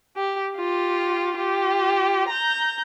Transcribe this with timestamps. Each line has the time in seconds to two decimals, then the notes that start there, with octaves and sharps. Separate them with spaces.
0.16 G4
0.54 F4 G4
1.37 F4 G4
2.29 A#5 G6